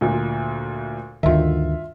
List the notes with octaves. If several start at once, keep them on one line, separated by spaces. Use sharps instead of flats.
D2 A#2
D2 G2 D#3 F4 E5